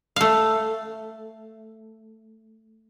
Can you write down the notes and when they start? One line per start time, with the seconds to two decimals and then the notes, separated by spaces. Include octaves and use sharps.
0.16 A3 F5